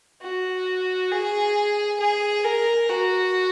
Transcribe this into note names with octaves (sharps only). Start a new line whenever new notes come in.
F#4
G#4
G#4
A#4
F#4